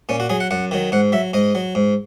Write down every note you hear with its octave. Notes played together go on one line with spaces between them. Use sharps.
A#2 C#4
F#4
F#3 G#4
F#5
F#2 F#5
D#3 F#3
G#2 F#5
F#3 E5
G#2 D#5
F#3
G#2